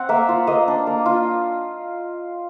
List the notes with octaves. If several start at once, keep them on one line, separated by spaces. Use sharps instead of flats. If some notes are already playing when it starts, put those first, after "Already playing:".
Already playing: C4 F#5
A#3 E5
F4
A#3 D#5
D4
A#3
F4